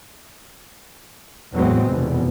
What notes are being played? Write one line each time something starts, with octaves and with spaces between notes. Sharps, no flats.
E2 A2 F#3 G#3 B3 C4
F1 E2 B2